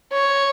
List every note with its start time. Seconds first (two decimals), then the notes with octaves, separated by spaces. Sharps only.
0.13 C#5